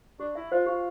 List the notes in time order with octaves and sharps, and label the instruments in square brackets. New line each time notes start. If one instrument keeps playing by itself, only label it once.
[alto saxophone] D4 [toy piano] G4
[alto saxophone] E4 [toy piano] E5
[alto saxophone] F4 [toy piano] C5
[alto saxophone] F4 [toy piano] G4